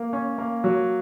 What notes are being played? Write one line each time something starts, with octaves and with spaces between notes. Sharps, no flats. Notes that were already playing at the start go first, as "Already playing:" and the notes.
Already playing: A#3
C#4
A#3
F#3